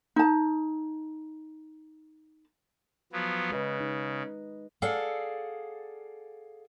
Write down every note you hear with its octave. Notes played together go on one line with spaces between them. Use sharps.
D#4 A5
F3 F#3 B3
C#3 G#3 B4 D#5
D#4
G#4 A4 D5 F5 F#5